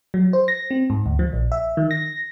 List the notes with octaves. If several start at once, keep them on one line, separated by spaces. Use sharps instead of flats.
F#3
C5
A#6
C4
G#2
D2
F3
A#1
E5
D#3
A#6